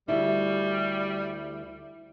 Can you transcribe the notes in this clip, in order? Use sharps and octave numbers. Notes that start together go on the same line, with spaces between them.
D2 G3 E4